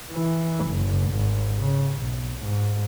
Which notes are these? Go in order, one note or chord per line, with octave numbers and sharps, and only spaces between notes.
E3
F#1
G#1
C#3
B1
G#2